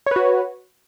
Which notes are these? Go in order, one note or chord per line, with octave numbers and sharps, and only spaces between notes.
F#4 B4 C#5